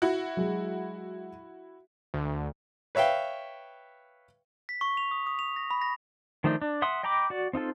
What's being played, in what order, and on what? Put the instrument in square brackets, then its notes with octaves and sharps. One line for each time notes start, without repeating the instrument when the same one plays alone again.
[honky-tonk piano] E4 F#4
[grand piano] F#3 G#3
[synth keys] D2
[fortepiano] B4 C#5 E5 F5 G5
[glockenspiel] B6
C#6
F7
D#6
D#6
F7
A#6
B5
A#6
[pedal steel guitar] D#3 F3 A3 D4 D#4
D4
E5 F#5 C6 D#6
D#5 G5 A#5 B5 D6
F#4 D5
C4 D#4 F4 A4